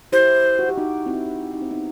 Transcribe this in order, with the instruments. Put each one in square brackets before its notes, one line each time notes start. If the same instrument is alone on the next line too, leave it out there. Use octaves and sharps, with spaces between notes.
[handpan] E4 G4 [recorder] C5
[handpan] F#4
G4
D#4 F#4
C4 E4
D#4
C4
B3 D#4